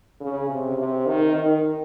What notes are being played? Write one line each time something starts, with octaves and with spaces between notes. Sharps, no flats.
C#3
C3
C3
D#3
D#3